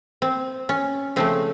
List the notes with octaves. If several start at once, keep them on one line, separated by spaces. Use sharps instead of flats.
C4
C#4
C#3 F3 A3 C4